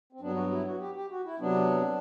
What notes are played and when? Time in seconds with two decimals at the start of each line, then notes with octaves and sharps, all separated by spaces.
0.13 C4
0.20 G2 F#3 B3 D4
0.36 F#4
0.51 E4
0.66 F#4
0.80 G4
0.95 G4
1.11 F#4
1.25 E4
1.40 C3 F#3 B3 D4